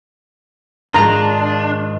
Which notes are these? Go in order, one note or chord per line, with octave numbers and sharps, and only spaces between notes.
G#2 D#3 G#3 D4 F4 A#5